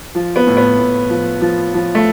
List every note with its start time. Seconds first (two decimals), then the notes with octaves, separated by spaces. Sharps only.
0.15 F3
0.36 B3
0.47 A2
0.57 B3
0.79 A2
1.10 F3
1.41 F3
1.74 F3
1.95 A3